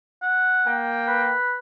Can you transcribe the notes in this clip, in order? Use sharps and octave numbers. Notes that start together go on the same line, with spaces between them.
F#5
A#3 G5
B4